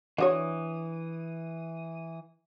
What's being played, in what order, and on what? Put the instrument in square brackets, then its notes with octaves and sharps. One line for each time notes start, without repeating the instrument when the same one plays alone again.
[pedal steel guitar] E3 D#6 [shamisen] D4 F#4 C#5